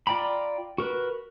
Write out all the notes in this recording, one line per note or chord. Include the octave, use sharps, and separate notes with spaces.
F4 D5 G5 A#5 B5
F#4 A#4 B4